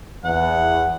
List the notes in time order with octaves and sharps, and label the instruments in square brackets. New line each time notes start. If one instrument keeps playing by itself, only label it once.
[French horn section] E2 [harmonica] F#5